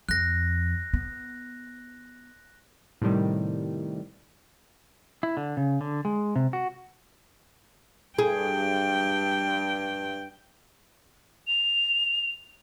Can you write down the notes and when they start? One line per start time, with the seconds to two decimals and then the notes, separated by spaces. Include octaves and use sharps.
0.09 F2 F#6 A#6
0.93 B3
3.02 A2 C3 D#3 G3
5.23 E4
5.37 D3
5.57 C#3
5.81 D3
6.05 G#3
6.36 C3
6.53 F#4
8.19 G2 G#4 G5
11.47 F7